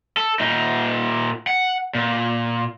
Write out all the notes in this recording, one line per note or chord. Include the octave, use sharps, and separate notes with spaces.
A4
A#2 D#4
F#5
A#2